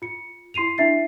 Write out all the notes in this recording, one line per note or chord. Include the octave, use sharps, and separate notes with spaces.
F4 C#7
E4 C6 C7 D#7 F7
D4 E4 E5 A6 C7